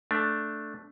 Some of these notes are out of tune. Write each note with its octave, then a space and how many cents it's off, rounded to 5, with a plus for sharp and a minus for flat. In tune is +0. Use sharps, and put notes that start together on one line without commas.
A3 +0 D4 +0